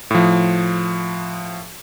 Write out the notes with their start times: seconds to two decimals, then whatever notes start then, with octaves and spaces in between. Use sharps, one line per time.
0.11 A2 F3